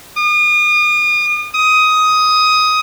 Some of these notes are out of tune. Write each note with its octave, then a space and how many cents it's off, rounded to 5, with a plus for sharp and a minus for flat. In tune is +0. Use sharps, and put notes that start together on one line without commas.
D#6 -40
D#6 +15